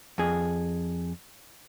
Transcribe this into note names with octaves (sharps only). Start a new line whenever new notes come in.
F2 G#4